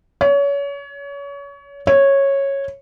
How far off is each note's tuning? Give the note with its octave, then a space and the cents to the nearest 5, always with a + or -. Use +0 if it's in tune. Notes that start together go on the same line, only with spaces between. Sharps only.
C#5 +30
C#5 -10